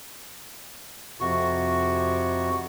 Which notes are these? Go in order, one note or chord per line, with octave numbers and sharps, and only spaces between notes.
F2 C3 F#4 C#6